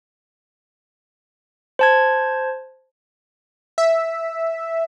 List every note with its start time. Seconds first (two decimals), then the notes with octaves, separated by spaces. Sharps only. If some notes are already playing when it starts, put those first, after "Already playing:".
1.79 C5 A5 G#6
3.78 E5